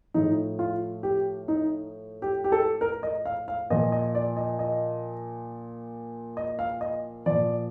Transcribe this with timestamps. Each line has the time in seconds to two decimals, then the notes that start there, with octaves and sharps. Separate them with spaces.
0.14 A2 F3 D#4
0.59 F4
1.03 G4
1.48 D#4
2.22 G4
2.44 G4
2.52 A4
2.81 A#4
3.03 D#5
3.25 F5
3.48 F5
3.70 A#2 F3 D#5
3.92 D#5
4.15 D5
4.37 D#5
4.59 D#5
6.37 D#5
6.59 F5
6.81 D#5
7.26 A#2 F3 D5